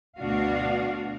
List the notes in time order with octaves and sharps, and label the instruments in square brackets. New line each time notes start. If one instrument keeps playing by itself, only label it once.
[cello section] D2 B2 B3 D4 F#4 F5